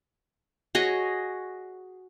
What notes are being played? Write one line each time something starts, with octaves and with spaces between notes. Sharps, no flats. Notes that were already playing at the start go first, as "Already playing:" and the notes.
F#4 G#4 C#5 D#5